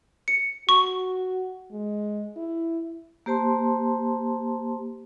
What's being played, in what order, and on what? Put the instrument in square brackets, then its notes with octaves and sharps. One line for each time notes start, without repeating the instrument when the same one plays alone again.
[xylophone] C#7
[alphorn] F#4 [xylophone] C#6
[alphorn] G#3
E4
[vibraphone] A#3 G4 C5 A5 C6